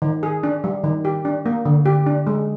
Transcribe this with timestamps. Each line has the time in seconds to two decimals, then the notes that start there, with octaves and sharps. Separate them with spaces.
0.02 D#3
0.23 G#4
0.43 D4
0.64 G3
0.84 D#3
1.05 G4
1.25 D4
1.46 A#3
1.65 D3
1.86 G4
2.06 D4
2.27 G#3